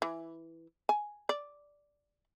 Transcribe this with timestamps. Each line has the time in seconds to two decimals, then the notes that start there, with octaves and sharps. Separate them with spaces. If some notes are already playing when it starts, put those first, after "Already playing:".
0.02 E3
0.89 G#5
1.29 D5